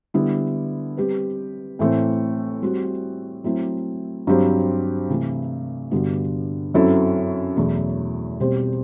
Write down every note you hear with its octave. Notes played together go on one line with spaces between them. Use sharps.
D3 G3 B3 E4
G3 C4 G4 B4
A2 E3 A3 C4
G3 C4 F#4
F#3 A3 C4 E4
G2 F#3 C4 G4 C5
C3 E3 A3 E4
G2 D3 G3 B3 F#4
F#2 F#3 C4 E4 A4
E2 B2 F#3 A3 E4
B2 G3 C4 G4 C5